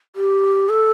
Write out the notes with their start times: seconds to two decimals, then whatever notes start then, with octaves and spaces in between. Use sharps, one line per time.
0.16 G4
0.69 A4